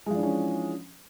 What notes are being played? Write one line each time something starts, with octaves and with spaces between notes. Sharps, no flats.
E3 F3 G#3 C#4 D4